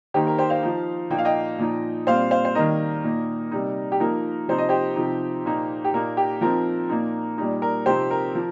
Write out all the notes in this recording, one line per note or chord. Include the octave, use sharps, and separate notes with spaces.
D#3 A#3 D#4 G4 C5
A#4
G4 C5
C5 F5
F3 D#4
A#2 F3 A#3 D#4 G5
F5
D#5 G5
A#2 F3 D#4
A#2 G3 C4 C5 F5
C5 F5
C5
D#3 G3 A#3 D#4 A#4 D#5
A#2 A#3 D#4
C3 G3 D#4
G4
F3 A#3 D#4 A#4
C3 F3 D#4 C5
D#5
G4 C5
C3 F3 D#4
A#2 A#3 D#4
G4
A#2 A#3 D#4 A#4
G4
F3 C4 D#4 A#4
A#2 A#3 D#4
A#2 G3 D#4
A#4
C3 F3 C4 D#4 G4 C5
A#4
F3